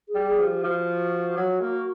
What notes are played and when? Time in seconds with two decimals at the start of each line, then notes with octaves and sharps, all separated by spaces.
0.09 G#4
0.15 G3
0.27 G#4
0.39 F3
0.45 G4
0.64 F3 F#4
1.37 F#3
1.61 A#3